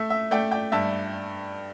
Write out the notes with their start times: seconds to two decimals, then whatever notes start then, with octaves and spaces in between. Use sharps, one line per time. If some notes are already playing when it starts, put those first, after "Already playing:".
Already playing: A3 E5
0.10 E5
0.31 A3 D5 G5
0.51 D5 G5
0.72 G2 E5 A5